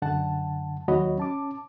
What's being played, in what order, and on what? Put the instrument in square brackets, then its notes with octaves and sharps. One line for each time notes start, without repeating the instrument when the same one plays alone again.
[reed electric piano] F#2 D3 F#5 A5
D#2 F#3 F#4 C#5 D#5 B5
C#4 A5 D6